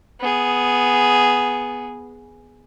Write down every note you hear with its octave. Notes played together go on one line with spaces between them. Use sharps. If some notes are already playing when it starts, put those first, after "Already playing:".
B3 G#4